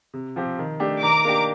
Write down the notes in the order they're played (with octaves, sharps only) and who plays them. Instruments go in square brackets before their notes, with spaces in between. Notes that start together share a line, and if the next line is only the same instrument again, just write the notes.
[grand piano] C3
F3 C4 G4
D#3
A3 D4 G4
[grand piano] D#3 [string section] A#5 D6
[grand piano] A#3 D4 G4